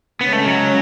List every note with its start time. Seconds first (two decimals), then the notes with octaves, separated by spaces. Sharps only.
0.21 C#3 G#3 B3 C#4
0.33 A3
0.45 F#3